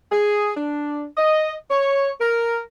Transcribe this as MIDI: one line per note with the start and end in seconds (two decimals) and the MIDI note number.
0.12 0.52 68
0.57 1.06 62
1.18 1.54 75
1.71 2.10 73
2.20 2.59 70